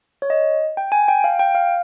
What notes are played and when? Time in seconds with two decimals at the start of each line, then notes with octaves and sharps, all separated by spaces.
0.22 C#5
0.30 D#5
0.77 G5
0.92 G#5
1.08 G5
1.24 F5
1.39 G5
1.55 F5